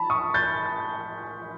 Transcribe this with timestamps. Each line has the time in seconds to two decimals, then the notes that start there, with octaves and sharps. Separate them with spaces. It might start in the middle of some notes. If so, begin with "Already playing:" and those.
Already playing: A5 B5
0.10 C#6 D#6
0.34 G6 A6